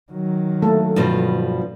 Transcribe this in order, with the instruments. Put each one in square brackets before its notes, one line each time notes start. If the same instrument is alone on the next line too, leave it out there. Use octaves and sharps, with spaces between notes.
[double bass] D#3 F#3
[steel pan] A3 A#3 A4
[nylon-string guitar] G2 B2 F3